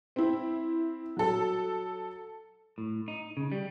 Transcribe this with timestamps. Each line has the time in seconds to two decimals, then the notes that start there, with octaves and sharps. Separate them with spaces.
0.16 C4 E4
1.17 F#3 A4
2.78 A2
3.08 D#4
3.37 C#3
3.52 G3